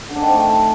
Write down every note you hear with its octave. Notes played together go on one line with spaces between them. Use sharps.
D3
D4
D#3
C4
A3